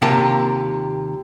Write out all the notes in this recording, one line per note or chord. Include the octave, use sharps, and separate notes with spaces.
D#2 C3 F4 G4 A#4 A5